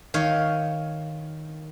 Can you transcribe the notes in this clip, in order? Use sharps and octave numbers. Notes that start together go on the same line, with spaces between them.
D#3 C#5 F5